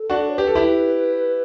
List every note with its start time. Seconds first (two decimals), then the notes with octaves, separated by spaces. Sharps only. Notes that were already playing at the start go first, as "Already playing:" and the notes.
Already playing: A4
0.10 D4 F#4
0.29 C#5
0.37 G4 B4
0.47 A4
0.55 E4 G4